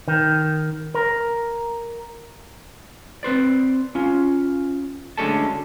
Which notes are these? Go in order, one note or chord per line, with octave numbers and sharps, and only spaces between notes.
D#3
A#4
C4 B4 C5 D5
C#4 F4
D2 D3 G#3 C#4 A4 A5